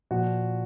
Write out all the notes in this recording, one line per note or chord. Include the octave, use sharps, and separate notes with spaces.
A#2 F3 F#4